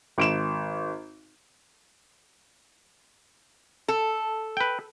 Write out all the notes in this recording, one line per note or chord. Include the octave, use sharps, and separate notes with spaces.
G#1 D7 E7
A4
B4 G5